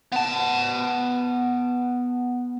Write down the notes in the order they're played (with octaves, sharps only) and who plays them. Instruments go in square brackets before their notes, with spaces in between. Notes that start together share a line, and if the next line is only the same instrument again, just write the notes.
[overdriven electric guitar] B3 A5